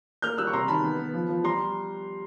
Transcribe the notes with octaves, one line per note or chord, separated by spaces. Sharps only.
A#3 F6 G6
G3 E6 F#6
C#6
C3 A#5 C6
D#3 A5 B5
B3
B3
F3
F3
G3 A#5 C6